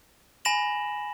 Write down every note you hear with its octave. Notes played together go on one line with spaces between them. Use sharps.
G#5 B5 A#6 E7 F#7